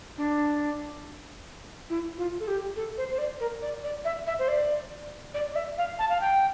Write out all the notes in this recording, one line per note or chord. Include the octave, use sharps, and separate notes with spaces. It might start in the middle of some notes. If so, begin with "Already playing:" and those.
D4
E4
F4
A4
G4
A4
C5
C5
D5
A#4
D5
D5
E5
E5
C5
D5
D5
D5
E5
F5
A5
F5
G5